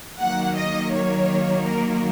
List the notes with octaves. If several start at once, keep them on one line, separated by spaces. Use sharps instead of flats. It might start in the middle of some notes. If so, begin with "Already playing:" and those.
D#3 F#3 A#3 F#5
D#5
C#5
A#4